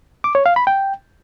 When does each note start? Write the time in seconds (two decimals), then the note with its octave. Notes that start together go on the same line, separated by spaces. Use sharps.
0.24 D6
0.35 C#5
0.46 F5
0.56 B5
0.67 G5